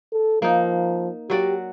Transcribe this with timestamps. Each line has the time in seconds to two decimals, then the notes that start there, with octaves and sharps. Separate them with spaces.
0.12 A4
0.42 F3 A#3 D#4
1.30 F#3 F#4 G4 D5